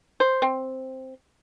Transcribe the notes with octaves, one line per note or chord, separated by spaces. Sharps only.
C5
C4